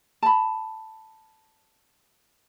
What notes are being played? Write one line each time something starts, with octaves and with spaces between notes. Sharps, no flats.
A5 B5